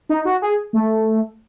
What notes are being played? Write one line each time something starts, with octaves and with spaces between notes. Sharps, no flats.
D#4
F#4
G#4
A3